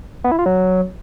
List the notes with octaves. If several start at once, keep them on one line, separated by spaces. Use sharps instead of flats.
B3
E4
F4
F#3